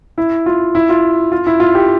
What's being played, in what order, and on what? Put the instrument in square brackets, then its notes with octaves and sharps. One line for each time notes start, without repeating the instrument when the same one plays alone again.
[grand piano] E4
F4
E4
F4
F4
E4
F4
G4